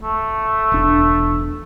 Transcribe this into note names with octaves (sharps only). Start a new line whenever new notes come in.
A3
E1 D4